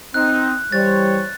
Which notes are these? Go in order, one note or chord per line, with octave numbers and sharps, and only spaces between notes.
C4 D#4 F#6
E3 G3 C5 C#5 A6